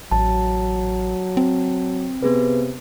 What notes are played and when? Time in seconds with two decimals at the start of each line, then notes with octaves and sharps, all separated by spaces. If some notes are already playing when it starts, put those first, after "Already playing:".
0.11 A1 F#3 A5
1.37 C4
2.22 C3 B3 G#4 B4